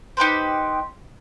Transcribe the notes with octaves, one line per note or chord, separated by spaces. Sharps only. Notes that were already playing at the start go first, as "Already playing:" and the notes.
D#4 G4 B4 C5